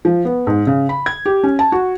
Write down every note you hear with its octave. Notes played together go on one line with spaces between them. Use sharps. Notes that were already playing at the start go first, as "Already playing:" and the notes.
F3
B3
G#2
C#3
B5
G#6
G4
C#4
A5
F#4